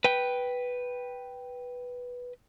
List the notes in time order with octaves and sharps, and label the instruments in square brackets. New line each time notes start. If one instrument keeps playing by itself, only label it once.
[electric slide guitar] B4 G5